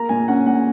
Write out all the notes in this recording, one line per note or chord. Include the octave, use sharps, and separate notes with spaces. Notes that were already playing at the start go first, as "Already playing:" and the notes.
Already playing: A#3 A#5
A#2 G#5
C#4 F#5
A#2 F#5